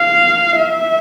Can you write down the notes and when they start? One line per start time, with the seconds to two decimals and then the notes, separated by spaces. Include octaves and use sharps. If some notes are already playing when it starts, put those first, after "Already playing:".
Already playing: F5
0.57 E5